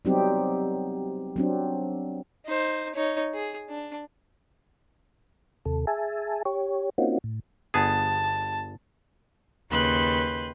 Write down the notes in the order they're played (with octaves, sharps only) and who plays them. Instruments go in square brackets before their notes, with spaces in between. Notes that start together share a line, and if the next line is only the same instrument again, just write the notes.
[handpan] F#3 G3 B3 C4 D#4 G4
F#3 C4 D4
[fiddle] D#4 C5
D#4 C#5
G#4
D4
[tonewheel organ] D#2 C3 A4
G#4 E5 G#5 A5
G4 C#5
A#3 C4 C#4 D#4 F4 F#4
A2
[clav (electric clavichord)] G1 B3 G#4 [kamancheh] A5
[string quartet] D#2 C#3 B4 C6 F#6 G6